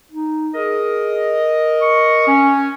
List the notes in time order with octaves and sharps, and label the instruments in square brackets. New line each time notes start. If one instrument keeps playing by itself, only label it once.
[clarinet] D#4
[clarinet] G#4 [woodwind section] A#4 D#5
[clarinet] C#6
[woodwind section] C#4